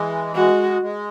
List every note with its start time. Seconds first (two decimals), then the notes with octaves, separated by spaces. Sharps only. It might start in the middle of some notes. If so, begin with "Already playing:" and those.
Already playing: E3 G#3
0.35 G#3 F#4
0.82 G#3